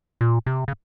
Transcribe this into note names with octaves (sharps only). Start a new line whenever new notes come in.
A#2
C3
C#3